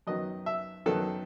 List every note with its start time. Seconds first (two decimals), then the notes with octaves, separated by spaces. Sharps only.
0.07 F#2 D#3 F#3 B3 D#5
0.46 E5
0.86 F#2 D#3 F#3 B3 A4